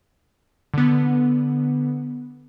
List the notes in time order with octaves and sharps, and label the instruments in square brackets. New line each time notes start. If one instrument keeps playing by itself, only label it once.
[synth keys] D3 B3